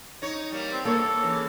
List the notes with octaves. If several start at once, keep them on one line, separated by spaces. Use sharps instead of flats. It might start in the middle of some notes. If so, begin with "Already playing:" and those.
D#4 C#5
G3 A#3
C4
G2 A#3 A4 C#5
C#3 E3